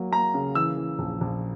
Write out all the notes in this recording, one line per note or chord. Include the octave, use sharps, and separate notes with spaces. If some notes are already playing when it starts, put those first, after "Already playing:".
Already playing: F#3 A#3
A#3 A#5
C#3
E3 E6
E3
A#1
A#1